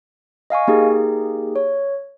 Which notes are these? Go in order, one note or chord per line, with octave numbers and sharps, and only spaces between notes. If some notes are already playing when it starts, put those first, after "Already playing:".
D#5 F5 G#5 C#6
A#3 D#4 G4 G#4
C#5